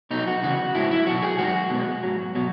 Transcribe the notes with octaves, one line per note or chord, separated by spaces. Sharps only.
B2 F#3 D#4
F#4
E2 C#3 F#4
G#2 F#3 E4
E4
B2 F#3 F#4
G#4
F#2 D#3 G#3 F#4
B2 G#3
G#2 F#3
B2 F#3